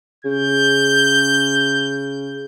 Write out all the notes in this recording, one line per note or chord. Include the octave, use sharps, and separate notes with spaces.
C#3 G6